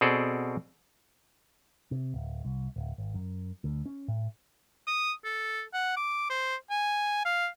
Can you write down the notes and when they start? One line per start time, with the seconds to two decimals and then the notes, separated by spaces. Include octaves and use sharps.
0.01 B2 C4 G#4 A4 D5
1.91 C3
2.14 D1
2.45 C2
2.76 D1
2.98 G#1
3.14 F#2
3.64 D2
3.86 C#4
4.08 A2
4.87 D#6
5.24 A4
5.73 F#5
5.97 D6
6.30 C5
6.70 G#5
7.25 F5